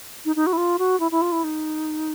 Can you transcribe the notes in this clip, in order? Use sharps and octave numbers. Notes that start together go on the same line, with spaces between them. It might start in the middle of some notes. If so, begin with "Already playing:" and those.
D#4
D#4
F#4
E4
F4
F#4
E4
E4
F4
E4
D#4